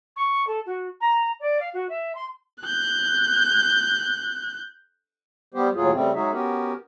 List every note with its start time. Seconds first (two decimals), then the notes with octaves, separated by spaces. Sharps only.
0.16 C#6
0.47 A4
0.66 F#4
1.01 A#5
1.40 D5
1.60 F5
1.74 F#4
1.89 E5
2.15 C6
2.62 F#6 G6
5.54 G3 B3 G4 C5
5.75 D#2 A2 F#3 F4 G#4
5.93 C#3 G3 A3 C4
6.14 F#3 G#3 D#4 F#4 G#4 E5
6.32 B3 C#4 F#4 G4 A#4